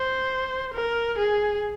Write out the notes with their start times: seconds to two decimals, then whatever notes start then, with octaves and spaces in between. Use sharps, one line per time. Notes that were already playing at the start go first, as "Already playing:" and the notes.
Already playing: C5
0.74 A#4
1.18 G#4